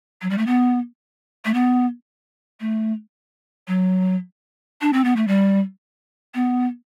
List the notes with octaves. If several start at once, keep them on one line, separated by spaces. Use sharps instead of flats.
F#3
G3
A3
B3
A3
B3
A3
F#3
D4
C4
B3
A3
G3
B3